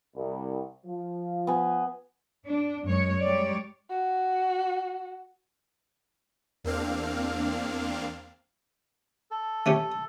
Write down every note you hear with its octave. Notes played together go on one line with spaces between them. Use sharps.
C2
F3
B3 G#5
D4
F#2 G#3 C#5
G3 G#3 C#5 D5
F#4
E2 A#3 C4 D4 F5
A4
A3 C#4 G4